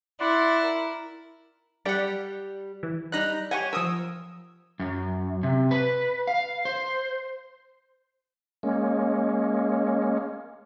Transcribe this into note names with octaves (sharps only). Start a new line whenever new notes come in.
E4 D5 F#5 C6
A#4
G3 G4 D5 F#5
E3
G3 D#4 A#5 F#6
G4 C#5 F#5 G#5
F3 A#4 D#6 E6
F#2
C3
B4
F5
C5
G#3 A#3 C#4